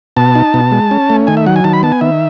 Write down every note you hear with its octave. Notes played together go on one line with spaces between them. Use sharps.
B2 A5
D#4
B2
G#3
C#4
A3
D#3 G#5
E5
F#3 F#5
G#5
D#3 A5
B5
B3 A5
G#5
D#3 E5